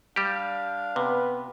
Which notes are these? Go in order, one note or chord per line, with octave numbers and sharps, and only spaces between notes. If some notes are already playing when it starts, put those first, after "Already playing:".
G3 D4 G4 F5
C3 B3 B4